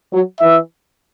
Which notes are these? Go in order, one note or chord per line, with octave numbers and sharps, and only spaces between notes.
F#3
E3 E5